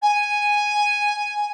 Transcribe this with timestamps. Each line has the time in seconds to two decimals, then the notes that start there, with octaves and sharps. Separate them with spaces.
0.02 G#5